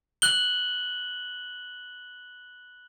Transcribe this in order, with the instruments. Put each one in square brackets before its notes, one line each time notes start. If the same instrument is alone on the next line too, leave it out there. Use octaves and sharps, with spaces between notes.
[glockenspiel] F#6 F#7 G7